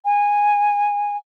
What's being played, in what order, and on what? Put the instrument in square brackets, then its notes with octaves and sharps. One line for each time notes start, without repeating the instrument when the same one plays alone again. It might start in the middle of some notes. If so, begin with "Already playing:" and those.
[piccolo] G#5